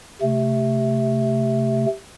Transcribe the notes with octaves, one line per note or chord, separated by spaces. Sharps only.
C3 A3